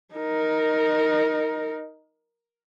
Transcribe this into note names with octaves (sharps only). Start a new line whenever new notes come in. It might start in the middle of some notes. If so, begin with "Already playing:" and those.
D#4 A#4